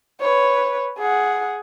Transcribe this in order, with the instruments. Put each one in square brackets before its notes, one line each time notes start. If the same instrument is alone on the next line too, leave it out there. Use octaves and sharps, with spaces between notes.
[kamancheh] B4 C#5
G#4 F#5